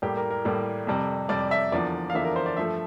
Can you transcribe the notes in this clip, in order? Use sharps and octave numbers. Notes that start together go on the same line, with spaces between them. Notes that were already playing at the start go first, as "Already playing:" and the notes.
A2 G3 A#3 G4
A#4
A#4
A2 G3 A#3
F2 C3 G3
F2 C3 G3 D5
E5
E2 D3 F3 A#3 D5
F5
E2 D3 F3 A#3 E5
A#4
C5
D5
G2 F3 A3 E5